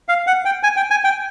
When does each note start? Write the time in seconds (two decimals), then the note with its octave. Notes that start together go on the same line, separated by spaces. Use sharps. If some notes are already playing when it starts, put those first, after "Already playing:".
0.08 F5
0.27 F#5
0.45 G5
0.63 G#5
0.77 G5
0.91 G#5
1.04 G5